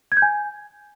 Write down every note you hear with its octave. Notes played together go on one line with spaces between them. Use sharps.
G#6
G6
G#5